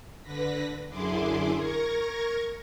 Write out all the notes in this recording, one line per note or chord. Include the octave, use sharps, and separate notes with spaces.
D3 B4 A#6 B6
F#2 D3 E4 G#4 C6 D6
A#4 C#6 G#6 A#6